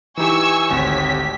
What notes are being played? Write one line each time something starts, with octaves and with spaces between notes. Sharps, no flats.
E3 D#4 G4 G#5 C#6 E6
G#1 D2 C4 G4 C#5 B6